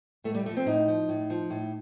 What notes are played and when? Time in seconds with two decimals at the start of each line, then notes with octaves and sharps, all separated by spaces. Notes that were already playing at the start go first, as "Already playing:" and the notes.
0.24 A2 A3
0.34 G3
0.46 F3 A3
0.57 C4
0.66 A2 D#4
0.88 F3
1.09 A2
1.30 F3
1.50 A2